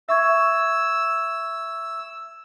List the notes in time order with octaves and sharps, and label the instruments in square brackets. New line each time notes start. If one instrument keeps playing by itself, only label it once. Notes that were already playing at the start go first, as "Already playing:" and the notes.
[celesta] E5 C#6 G#6 [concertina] E6